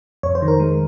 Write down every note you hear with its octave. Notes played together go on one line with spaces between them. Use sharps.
F2 C#5
C5
D#3
A#4
G#3